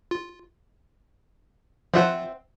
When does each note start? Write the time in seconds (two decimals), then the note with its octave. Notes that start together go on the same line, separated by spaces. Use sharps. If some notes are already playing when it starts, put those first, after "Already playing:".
0.11 F4
1.94 F3 C4 F4 C5 E5 F#5